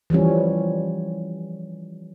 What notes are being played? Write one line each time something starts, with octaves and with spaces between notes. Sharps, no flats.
E3 F3 G3 C#4